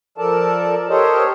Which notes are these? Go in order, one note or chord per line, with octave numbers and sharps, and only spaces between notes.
F3 A4 A#4 D5 A5
G4 A4 A#4 C5 C#5 D#5